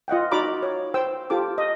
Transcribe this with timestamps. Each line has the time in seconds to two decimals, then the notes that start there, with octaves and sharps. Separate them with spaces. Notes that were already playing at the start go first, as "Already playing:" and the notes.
0.08 F4 D#5 F#5 G5
0.32 D#4 F#4 D5 A#5 B5 D6
0.63 C#5
0.94 C5 G5 E6
1.30 F4 G4 A4 D6
1.58 D#5